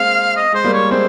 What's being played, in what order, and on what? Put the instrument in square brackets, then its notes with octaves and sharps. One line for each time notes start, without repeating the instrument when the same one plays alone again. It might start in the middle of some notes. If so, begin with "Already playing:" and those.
Already playing: [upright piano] G#3 A#3 C4 [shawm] F5
[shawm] D#5
[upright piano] G#3 [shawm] C5
[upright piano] G3 A#3
[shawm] C#5
[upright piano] G#3 C4 [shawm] C5